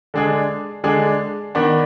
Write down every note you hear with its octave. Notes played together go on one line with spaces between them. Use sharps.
D3 G#3 D4 G#4
D3 G#3 D4 G#4
D#3 B3 D4